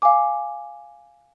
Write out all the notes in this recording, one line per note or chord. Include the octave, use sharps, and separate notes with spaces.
F5 G#5 D6